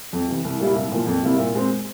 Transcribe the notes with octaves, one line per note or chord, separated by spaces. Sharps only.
F2
C3 E3
C2
A#2 G3 A#3 E4
C2
A#2 F3 A#3
F2
C3 G3 A#3 E4
A#2
G#3 C4